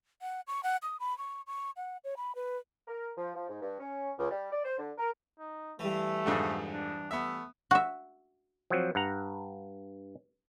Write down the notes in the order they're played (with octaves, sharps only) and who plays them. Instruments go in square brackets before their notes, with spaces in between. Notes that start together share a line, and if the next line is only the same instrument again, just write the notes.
[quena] F#5
C#6
F#5
D#6
B5
C#6
C#6
F#5
C#5
B5
B4
[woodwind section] A#4
F3
F3
G#2
G2
C#4
C#2
G3
D5
C5
D3
A#4
[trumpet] D#4
[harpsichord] G2 E3 [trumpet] A3
[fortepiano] F2 G#2 D3
[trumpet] D4
[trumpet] A3 [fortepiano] B3 E5
[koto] F#4 E5
[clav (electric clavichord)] F3 F#3 C4
G2 F#5 A#5